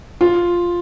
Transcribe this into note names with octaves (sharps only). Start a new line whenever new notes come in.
F4